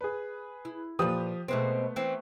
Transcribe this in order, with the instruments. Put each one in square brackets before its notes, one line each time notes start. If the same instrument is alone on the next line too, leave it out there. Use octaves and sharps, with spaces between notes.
[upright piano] G#4 B4
[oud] E4
[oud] A#2 B4 [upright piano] F3 G4 D#6
[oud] B2 G#3 C4 [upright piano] A3 B3
[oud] E3 C4